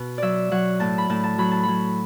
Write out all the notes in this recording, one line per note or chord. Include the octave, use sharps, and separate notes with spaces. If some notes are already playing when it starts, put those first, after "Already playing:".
Already playing: B2 B4
F#3 D5 E5
F#3 F#5
A2 A5
B5
A2 A5
A5
F#3 B5
A5
F#3 B5